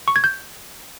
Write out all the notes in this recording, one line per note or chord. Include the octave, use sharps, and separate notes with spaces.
C#6
G#6
G6